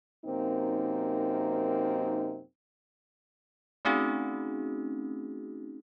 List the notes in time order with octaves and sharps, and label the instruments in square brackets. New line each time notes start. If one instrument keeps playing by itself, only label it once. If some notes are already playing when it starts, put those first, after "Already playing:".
[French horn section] F#2 C3 A#3 C4 D#4
[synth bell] A3 C4 C#4 D#4 F#4 G#4